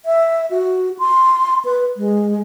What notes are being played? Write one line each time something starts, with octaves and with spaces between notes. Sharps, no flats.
E5
F#4
C6
B4
G#3